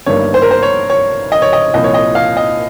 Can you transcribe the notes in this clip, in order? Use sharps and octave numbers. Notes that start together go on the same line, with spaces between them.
G1 G2 D#3 G3 A#3 C#5
C5
A#4
C5
C#5
C#5
D#5
C#5
D#5
C2 A#2 F3 D#5
C#5
D#5
F5
D#5